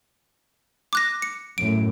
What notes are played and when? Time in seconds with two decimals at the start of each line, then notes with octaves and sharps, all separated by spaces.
0.93 D6 F#6 A#6
1.22 C#7
1.58 F#2 A2 D7